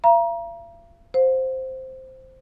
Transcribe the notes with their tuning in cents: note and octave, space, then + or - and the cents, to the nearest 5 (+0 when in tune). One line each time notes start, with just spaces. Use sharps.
F5 -45 A#5 +25
C5 +0 F5 +45